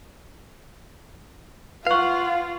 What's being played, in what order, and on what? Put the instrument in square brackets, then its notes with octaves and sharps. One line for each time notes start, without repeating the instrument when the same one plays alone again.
[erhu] F4 [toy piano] B4 C#6 [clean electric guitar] F5 F#5